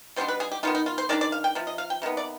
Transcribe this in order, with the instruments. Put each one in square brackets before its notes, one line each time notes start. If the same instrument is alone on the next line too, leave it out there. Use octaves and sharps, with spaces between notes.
[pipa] B2 G3 B3 D4 C5
B4
G#4
G4
D#3 B3 D#4 F4
D#4
F4
C5
D#3 G#3 D4 D5
D5
F5
G5
C3 F3
D#5
F5
G5
C3 D#3 B3
D5